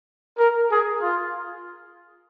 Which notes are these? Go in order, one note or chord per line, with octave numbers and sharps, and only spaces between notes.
A#4
G#4
F4